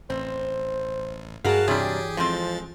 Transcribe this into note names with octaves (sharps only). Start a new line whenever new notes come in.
A1 C4 C5
G2 F#3 G#3 F#4 G#4 A#4 F5 A5
C3 E3 F#3 G3 D4 G4 G#4
F2 F3 G#3 C4 A6